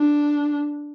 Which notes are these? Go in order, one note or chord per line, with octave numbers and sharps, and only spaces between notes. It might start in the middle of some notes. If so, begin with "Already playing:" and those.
Already playing: D4